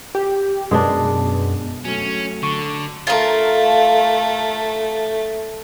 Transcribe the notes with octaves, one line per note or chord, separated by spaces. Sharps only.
G4
F#2 B2 G#3 D4
F#3 A3 C#4
D3 C#6
A3 F4 A#4